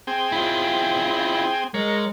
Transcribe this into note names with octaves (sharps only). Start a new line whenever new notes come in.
C4 G#4 G5
E4 F4
G#3 A#4 C#5